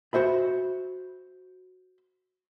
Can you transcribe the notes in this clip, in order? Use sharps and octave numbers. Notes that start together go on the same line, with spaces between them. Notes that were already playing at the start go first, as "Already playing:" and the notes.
F#4 C5 E5 B5